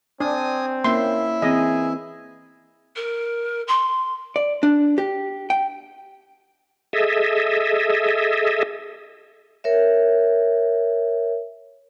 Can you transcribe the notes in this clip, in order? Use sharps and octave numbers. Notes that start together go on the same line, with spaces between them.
C4 D4 D5 G#5 D#6
A#3 C#4 E4 E5 C6
E3 C4 G#4 D#5
A#4
C6
D5
D4
G4
G5
G#4 A4 D#5 E5
A#4 C#5 E5